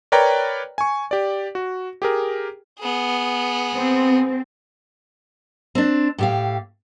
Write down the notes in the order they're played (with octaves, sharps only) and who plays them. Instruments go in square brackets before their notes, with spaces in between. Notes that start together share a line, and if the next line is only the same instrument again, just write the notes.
[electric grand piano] A#4 B4 C#5 D5 G5 A#5
G#5 C#6
G4 D5
F#4
G4 G#4 A#4
[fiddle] B3 G#4
[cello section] C4
[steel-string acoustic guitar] C4 D4
A2 G4 F5